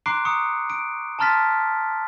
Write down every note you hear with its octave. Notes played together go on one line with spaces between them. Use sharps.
A#5 C6 D6 F#6 C7 D7
A#5 C#6 D#6 C#7
D7
A5 A#5 C6 F6 A6 B6